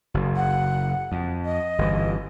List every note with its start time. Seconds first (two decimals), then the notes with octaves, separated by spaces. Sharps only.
0.14 F#1
0.36 F#5
1.12 F2
1.45 D#5
1.78 G1 E3